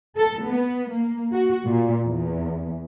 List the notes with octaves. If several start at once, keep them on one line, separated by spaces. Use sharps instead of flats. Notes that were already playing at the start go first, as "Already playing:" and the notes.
A4
B3
A#3
F#4
A#2
E2